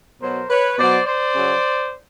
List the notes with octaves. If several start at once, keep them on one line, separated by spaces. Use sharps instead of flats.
B2 F#3 A#4 C5
B4 C#5
B2 F#3 C5 D5
C5 D5
C#3 F#3